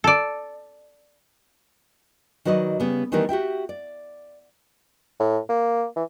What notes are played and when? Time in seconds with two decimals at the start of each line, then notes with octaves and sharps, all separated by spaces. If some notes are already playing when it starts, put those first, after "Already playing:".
0.04 A4 D5
2.45 D#3 F#3 B4 D5 D#5
2.80 C#3 G3 B3
3.12 D#3 E3 G3 A3 B3 A#4
3.29 F#4 G4 E5 G5
3.69 D5
5.20 A2
5.49 A#3
5.96 E3